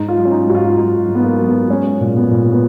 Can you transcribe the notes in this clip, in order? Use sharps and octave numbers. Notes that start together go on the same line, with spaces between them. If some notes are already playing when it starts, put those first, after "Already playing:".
Already playing: G#2 D#4
F4
F#3
C#4
D#4
G#2 F#4
F4
F#3 D#4
G#2
B3
A#3
F#3
B3
G#3 C#4
A#2
B3
A#2
B3